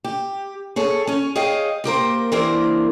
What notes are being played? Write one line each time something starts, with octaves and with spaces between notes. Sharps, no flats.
G4
G#4 A4 C#5
C#4 C#5
G#4 C#5 D#5 F5 G5
A#3 G4 A#4 C5
E3 A#3 C4 D4 A#4 C5